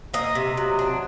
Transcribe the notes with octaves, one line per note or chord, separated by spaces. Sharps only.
A#3 D#5
C3
F#3
D4